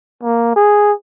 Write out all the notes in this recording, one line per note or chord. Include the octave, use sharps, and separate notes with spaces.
A#3
G#4